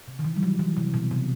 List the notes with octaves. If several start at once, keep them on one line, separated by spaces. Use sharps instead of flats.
C3
D#3
E3
G3
F#3
E3
C3
B2
C3